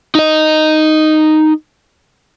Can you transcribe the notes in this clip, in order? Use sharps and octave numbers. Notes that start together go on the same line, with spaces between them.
D#4 D#5